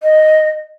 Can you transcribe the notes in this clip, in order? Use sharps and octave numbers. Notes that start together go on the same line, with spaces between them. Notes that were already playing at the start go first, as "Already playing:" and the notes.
D#5